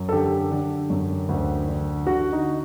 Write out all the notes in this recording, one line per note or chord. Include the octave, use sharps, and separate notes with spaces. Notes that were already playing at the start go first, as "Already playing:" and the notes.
Already playing: F#2
A4
D3 G4
D3
F#2
D2
D3
D3 F#4
D#4